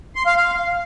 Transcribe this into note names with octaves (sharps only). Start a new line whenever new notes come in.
C6
F5
F5